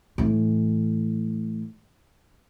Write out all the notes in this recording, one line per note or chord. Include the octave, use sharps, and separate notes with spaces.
A2 E3